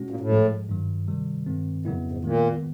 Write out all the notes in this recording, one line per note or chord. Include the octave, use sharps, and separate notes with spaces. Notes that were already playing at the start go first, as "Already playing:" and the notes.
Already playing: B2 G#3 C#4 F#4
A#2
A2
G#2 F3 G#3
G2 D#3 F#3
C3 D#3 G3
G2 D#3 G#3 C4
F2 A#2 C#3 F#3 B3 E4
G#2
A#2 D#3 G#3 B3